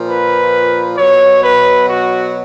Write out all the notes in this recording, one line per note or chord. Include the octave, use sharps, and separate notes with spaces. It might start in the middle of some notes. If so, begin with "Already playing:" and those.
Already playing: A#2 F3
B4
B2 F#3 C#5
B4
F#4